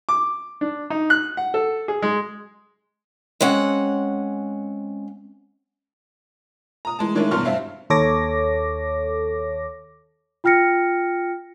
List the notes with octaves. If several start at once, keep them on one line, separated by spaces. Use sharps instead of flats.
D6
D4
D#4
F#6
F#5
A4
G#4
G#3
G#3 C4 C#4 F#5
A#5 D#6
E3 G#3 A5
D#3 G#3 A#3 C#4 D4 E4
E2 G2 B2 C6 C#6 F6
G2 C4 E5 F5
D#2 A4 C#5 D6 A#6
F4 G5 F6 A#6 C#7